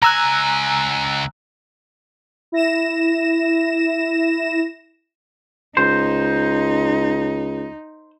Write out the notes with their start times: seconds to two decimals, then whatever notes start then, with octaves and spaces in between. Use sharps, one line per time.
0.02 C#2 G#5 A#5 E6 F#6
2.52 E4 A#6 E7
5.77 C#2 D#4 C5